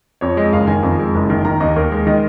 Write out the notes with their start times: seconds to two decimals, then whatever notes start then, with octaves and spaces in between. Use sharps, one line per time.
0.21 F2 C#5
0.37 G#3 D#5
0.52 F#1 F5
0.67 D#3 G#5
0.83 F2
0.99 G#3
1.15 F#1
1.30 D#3
1.45 D#3 A#5
1.60 D#2 D#5
1.76 D#2 A#4
1.92 G#3
2.07 D#3 D#5